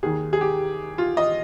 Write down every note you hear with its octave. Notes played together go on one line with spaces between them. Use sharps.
D#2 D#3 G#4
G#4
G4
F4
D#5